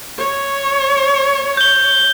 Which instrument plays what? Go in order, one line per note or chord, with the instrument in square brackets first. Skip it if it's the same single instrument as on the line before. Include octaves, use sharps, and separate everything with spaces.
[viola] C#5
[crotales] G6 G7